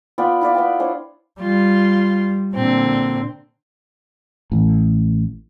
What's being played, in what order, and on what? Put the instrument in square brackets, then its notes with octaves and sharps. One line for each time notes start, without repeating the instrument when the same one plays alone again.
[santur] B3 F4 D5 G5
E4 F4 D5
B3 D5 G5
D4 C5 C#5
[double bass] G3 [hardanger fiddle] F4
[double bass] A#2 D3 [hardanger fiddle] C4
[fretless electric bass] A1